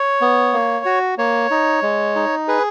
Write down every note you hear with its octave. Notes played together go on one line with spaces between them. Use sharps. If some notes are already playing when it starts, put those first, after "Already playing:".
Already playing: C#5
B3
A#3
F#4
A#3 C#5
D#4
G#3
D#4
G#4 B4